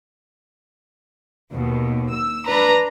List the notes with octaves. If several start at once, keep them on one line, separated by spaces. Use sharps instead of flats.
D#2 B2
E6
D4 B4 A#5